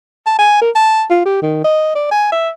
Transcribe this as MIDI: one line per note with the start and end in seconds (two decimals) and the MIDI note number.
0.26 0.38 81
0.38 0.60 80
0.61 0.70 70
0.75 1.03 81
1.10 1.23 65
1.26 1.41 67
1.42 1.60 51
1.64 1.91 75
1.95 2.09 74
2.11 2.29 80
2.32 2.49 76